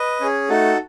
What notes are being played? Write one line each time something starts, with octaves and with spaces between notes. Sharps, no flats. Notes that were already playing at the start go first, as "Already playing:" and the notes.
Already playing: B4 D#5
C#4 G#4
A3 D#4 F#4 A4